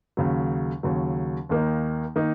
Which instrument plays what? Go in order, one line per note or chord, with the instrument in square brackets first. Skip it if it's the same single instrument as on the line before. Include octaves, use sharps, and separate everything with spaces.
[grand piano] D#2 C#3 F#3
D#2 C#3 F#3
D#2 D#3 A#3 D#4
D#3 A#3 D#4